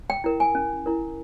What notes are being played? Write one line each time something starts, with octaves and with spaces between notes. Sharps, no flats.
G5
E4 A#4
G#5
C#4
E4 A#4